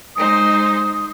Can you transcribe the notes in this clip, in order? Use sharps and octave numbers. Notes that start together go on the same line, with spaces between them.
G#3 D#4 C5 D#6